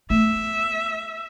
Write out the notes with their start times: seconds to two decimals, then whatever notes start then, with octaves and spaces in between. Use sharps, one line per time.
0.10 A3 B3 E5